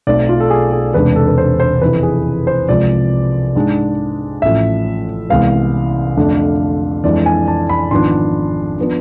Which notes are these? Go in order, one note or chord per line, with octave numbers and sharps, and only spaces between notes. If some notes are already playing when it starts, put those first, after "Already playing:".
B1 B2 A3 C4 D5
F4
A4
G#4
G#4
E1 E2 C3 G#3 D4 B4
A4
B4
C5
C5
F1 F2 E3 B4
G#4
C5
C2 C3 F3 G#3 D5
G#2 G#3 D4
A1 A2 F3 E5
C2 C3 E3 G#3 B3 F5
F2 D3 A3 D4
F2 E3 G#3 D4 D5
G#5
A5
B5
G#1 G#2 F3 B3 D4 C6
F3 B3 D4